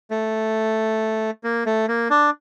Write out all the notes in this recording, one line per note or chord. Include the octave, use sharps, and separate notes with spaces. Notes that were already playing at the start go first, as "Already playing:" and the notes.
A3
A#3
A3
A#3
D4